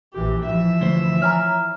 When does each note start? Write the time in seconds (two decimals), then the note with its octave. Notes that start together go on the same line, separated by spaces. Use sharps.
0.13 A#1 E3 G4
0.45 E3 F3 E5
0.81 D2 C5
1.22 C#5 G#5 A#5 F6